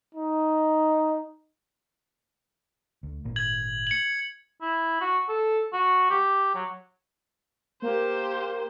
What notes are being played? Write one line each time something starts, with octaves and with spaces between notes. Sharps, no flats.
D#4
D2
G#1 A#2 A#3
G#6 F#7
C#7 F#7
E4
F#4
A4
F#4
G4
F#3
A#3 G4 C5